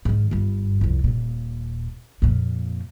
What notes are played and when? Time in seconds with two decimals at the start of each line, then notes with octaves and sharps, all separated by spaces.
0.05 G#2 D#3
0.31 G1 G2
0.81 C2 F2
1.04 D#1 A#2
2.22 F2 A#2